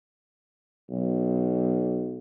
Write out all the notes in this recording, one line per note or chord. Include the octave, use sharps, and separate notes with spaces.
B1